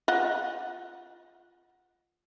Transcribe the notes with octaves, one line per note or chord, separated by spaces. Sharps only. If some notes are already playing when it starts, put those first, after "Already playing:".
F4 D#5 F#5